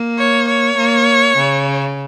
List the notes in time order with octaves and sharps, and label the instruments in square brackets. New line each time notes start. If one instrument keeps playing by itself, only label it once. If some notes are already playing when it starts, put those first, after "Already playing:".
Already playing: [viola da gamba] A#3
[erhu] C#5
C#5
[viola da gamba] A#3
C#3